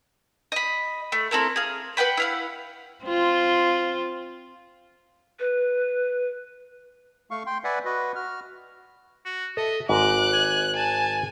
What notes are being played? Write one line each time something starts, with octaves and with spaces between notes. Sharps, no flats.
D#5 B5
A3
C4 E4 A4 A#4
G#4 F5
B4 F#5 G5 B5
E4 F5 F#5
C4 F4
B4
A3 F5 C#6
G5 C6
B4 D5 E5 F#5 G#5
F#4 B4 D#5
F#4 F6
F#4
A4 D#5 E5
G#1 G#2 D#5 D6 F#6
G#5
G#5 A5